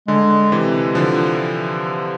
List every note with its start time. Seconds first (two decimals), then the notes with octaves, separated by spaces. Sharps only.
0.08 D3 G#3
0.52 C3 E3
0.95 D3 F3